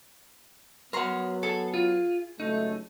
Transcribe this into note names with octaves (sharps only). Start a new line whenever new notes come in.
F#3 B3 A#4 F#5 A#5 C6
G#4 A4
F4
C#2 F#3 A3 D#4